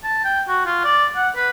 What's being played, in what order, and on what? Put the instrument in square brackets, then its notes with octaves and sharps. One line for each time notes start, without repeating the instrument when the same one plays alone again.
[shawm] A5
G5
F#4
F4
D5
F#5
B4